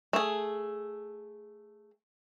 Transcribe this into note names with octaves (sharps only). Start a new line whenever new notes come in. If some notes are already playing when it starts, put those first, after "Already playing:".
A3 G#4